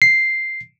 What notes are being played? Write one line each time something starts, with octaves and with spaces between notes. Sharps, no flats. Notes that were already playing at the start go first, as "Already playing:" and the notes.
C7